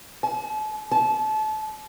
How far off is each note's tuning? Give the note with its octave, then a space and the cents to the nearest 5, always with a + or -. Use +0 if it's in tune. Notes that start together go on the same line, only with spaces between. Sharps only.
A5 -45
A5 -30